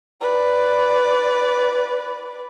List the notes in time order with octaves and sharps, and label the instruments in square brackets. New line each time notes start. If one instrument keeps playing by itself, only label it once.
[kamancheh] B4 D5